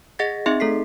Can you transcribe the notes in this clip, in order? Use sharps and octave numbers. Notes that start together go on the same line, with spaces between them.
G#4 D#5 F#5 A6 A#6
C4 D#4 G#4 D#5 E5 C6
A3 A4 B6 C7